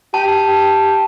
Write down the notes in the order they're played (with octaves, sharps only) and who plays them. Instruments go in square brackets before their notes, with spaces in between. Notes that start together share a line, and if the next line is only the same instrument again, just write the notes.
[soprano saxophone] G4 [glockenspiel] A5